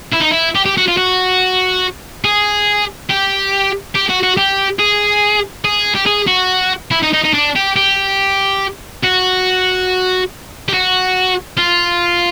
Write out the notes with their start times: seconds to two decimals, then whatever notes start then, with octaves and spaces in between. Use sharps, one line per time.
0.13 E4
0.21 D#4
0.31 E4
0.55 G4
0.66 G4
0.77 F#4
0.88 F4
0.97 F#4
2.25 G#4
3.10 G4
3.95 G4
4.09 F#4
4.23 F#4
4.37 G4
4.79 G#4
5.65 G#4
5.95 G4
6.06 G#4
6.27 F#4
6.91 E4
7.03 D#4
7.13 D#4
7.24 D#4
7.33 D4
7.56 G4
7.76 G4
9.04 F#4
10.68 G4
10.73 F#4
11.58 F4